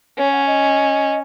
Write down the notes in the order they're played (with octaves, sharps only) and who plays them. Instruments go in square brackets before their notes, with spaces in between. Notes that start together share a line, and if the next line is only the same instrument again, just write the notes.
[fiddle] C#4 [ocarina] C#5
[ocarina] F#5
D#5